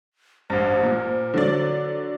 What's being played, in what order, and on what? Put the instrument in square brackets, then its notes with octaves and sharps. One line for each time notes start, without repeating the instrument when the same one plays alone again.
[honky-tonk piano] A1 G2 [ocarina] C5
[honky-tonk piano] A#2
D3 F#3 D5